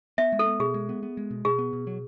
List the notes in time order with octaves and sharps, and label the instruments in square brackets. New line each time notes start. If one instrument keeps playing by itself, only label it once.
[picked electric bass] B3 [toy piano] E5
[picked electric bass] G#3
[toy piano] A4
[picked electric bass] B3
[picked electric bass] B2 [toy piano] G#4
[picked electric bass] G#3
B3
B3
G#3
B2
[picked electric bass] B2 [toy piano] G#4
[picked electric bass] B3
B2
F#3